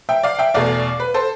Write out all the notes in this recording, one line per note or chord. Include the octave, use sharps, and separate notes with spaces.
E5 G5
D5 F5
E5 G5
E2 B2 A3 D5 F5
B4
A4 C5